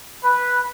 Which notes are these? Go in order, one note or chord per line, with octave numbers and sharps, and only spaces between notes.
B4